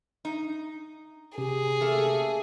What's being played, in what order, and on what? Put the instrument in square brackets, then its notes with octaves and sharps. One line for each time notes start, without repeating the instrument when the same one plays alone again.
[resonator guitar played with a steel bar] D#4
[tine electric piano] C3 C#4 G4 [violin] G#4
[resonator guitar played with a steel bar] A3 A#3 A4